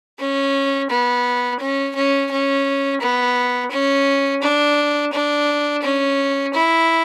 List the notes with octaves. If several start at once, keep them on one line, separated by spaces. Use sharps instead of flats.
C#4
B3
C#4
C#4
C#4
B3
C#4
D4
D4
C#4
E4